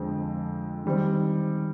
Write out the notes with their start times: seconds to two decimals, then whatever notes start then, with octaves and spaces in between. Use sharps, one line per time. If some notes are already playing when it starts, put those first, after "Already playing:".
Already playing: F2 D3 G#3 C4
0.85 D#3 G3 C4 G4